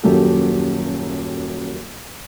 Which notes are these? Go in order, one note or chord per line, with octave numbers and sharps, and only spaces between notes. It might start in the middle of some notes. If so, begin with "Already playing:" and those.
D#1 F#2 F#3 A#3 G4 A4